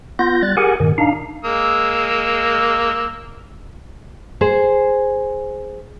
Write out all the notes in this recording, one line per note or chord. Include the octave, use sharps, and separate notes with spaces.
B3 F4 G6 A#6
G3 F#6 A6
G4 G#4 A#4 F#5 G#5
G2 A#2 D#3
D4 D#4 F5
G#3 A#3 E6
G#4 C5